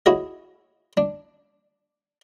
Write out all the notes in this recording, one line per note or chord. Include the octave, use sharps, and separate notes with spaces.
E4 F#4 G#4 C#5 D#5
D4